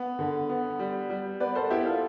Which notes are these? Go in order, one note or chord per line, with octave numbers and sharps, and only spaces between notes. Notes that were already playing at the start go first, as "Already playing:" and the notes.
Already playing: B3 B4
D3
B3
G3
G3
B3 B4 D5
A4 C5
B3 E4 G4
F4 A4